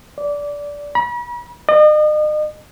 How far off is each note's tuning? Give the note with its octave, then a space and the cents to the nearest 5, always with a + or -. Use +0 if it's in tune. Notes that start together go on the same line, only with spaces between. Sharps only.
D5 -15
B5 -40
D#5 -40